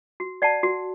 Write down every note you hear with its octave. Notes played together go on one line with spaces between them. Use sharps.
F#4
D5 F#5 A5
F#4